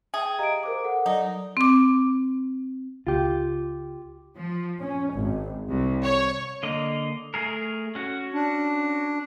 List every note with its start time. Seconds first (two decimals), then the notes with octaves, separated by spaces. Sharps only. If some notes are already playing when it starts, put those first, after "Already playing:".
0.14 G#4 E5 G5
0.39 G4 D#5 F5 A#5 D7
0.63 A#4 C5 D6
0.84 A4 F#5
1.06 F#3 D#4 D5
1.57 C4 D6
3.07 C#2 F4 G4
4.36 F3
4.80 C#4
5.13 G#1
5.69 C2
6.04 C#5
6.63 D3 A#3 D#5
7.34 A3 G#4 A#4
7.95 C#4 F#4
8.34 D4